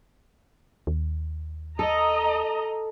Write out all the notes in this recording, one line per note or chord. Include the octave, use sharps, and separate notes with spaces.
D#2
A4 D#5 A#5